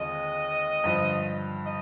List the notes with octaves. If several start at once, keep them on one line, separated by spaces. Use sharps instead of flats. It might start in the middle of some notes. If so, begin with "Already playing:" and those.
Already playing: D#2 D3 G#3 C4 F4 D#5
G2 D3 F3
D#5